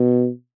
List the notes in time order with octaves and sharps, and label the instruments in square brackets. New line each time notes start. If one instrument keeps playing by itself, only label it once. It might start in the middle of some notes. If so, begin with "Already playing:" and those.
Already playing: [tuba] B2